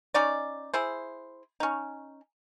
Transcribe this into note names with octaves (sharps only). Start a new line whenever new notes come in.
C#4 D#4 D5
E4 G#4 C5
C#4 D#4